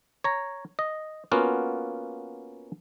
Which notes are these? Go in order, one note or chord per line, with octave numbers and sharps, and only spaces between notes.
C#5 A#5
D#5
A#3 B3 C#4 F4 F#4